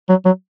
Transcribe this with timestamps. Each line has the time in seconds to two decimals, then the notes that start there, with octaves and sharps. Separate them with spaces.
0.09 F#3
0.25 F#3